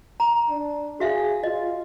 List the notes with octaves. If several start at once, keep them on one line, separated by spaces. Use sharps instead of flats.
A#5
D4
F#4 G#4 E5 F5
F4 D#5